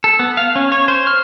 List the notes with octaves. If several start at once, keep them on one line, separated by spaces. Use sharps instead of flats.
A4
B3
F5
C#4
C#5
C5
F6